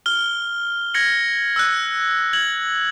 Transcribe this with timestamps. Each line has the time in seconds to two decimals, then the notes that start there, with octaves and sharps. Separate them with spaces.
0.06 F6 G7
0.94 F6 G#6 A#6 C#7 F#7
1.56 E6 F#6
2.33 G#6 F#7